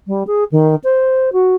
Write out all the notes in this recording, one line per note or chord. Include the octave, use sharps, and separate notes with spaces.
G3
G#4
D#3
C5
F#4